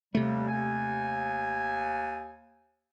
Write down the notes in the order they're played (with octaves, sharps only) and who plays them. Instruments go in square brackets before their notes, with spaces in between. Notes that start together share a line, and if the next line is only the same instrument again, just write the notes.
[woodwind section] D#2 G3 [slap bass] C3 A3
[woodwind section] D#2 G#5